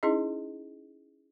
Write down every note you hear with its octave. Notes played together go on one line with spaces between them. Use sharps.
C#4 D#4 E4 G#4 D#5